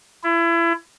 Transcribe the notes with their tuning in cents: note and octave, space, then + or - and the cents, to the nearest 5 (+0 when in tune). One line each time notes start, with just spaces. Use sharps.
E4 +30